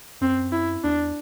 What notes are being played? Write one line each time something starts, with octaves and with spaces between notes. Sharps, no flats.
F#2 C4
E4
E2 D4